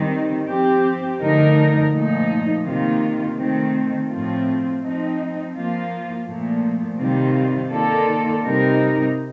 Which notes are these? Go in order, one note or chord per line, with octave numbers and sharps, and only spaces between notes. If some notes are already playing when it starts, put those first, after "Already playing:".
Already playing: D#3 G3 C4
F3 C4 G4
D3 F3 A3 D#4 A#4
A#2 F3 A3 D#4
C3 D#3 A#3 F4
D#3 A3 C4
A2 F3 A3 C4 F4
F3 C4 D#4
F3 A#3 F4
A#2 F3 A3
C3 D#3 G3 C4 F4
D#3 A#3 F4 A4 D5
C3 G3 C4 D#4 A#4